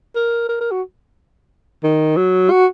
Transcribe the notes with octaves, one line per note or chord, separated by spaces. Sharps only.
A#4
A#4
A#4
F#4
D#3
F#3
F#4